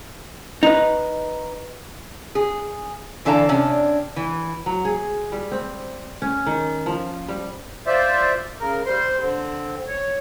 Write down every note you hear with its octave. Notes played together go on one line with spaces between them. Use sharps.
D#4 B4
G#4
D3 E3 D4 A4 F5 A#5
C3 C#4 D4
E3
F#3
G#4
G3
C4
C#4
D#3
F3
G3
F4 C5 D5 E5
C#3 A#4
G3 C5 C6
D3 C4
C#5